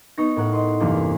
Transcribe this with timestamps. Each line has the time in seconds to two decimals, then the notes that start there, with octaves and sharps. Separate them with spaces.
0.18 B3 D#4 C#6 A#6
0.36 A2 A#4 F#5
0.53 D#5 C6
0.80 E2 G2 C3 A#3 D4